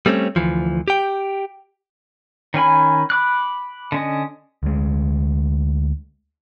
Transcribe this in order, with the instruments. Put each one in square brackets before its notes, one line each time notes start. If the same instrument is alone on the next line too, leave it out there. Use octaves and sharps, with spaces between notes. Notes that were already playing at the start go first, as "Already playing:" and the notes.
[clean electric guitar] G3 A3 C4 C#4
D2 E3 F3
G4 G5
[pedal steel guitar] D#3 C#4 G#5 B5
B5 D6 F#6
D3 C#4 D#5
[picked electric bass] D2 G#3